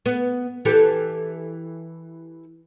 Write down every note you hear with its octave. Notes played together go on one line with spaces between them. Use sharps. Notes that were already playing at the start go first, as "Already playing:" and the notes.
B3
E3 G4 A4